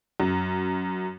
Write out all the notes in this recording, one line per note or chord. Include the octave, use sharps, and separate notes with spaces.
F#2